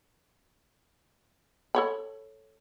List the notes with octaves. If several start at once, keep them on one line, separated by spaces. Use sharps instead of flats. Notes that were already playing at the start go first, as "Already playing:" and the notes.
A4 C#5 B5